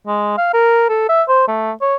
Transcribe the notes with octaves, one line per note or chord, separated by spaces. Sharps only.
G#3
F5
A#4
A4
E5
C5
A3
C#5